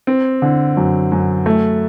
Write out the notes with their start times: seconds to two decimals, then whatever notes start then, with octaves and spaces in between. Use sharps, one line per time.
0.07 C4
0.42 D3
0.77 F#2
1.12 F#2
1.46 A3